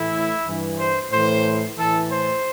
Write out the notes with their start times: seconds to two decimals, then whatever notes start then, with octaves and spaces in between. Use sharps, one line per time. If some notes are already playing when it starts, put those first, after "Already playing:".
Already playing: A2 E3 E4
0.46 G2 E3
0.79 C5
1.11 A2 E3 C5
1.77 A2 E3 A4
2.10 C5